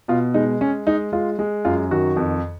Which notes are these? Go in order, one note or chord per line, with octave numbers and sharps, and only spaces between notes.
B2 F4
G#3 D#4
G#3 C#4
G#3 D#4
G#3 F4
G#3
F#2 F4
D#3 F#4
F2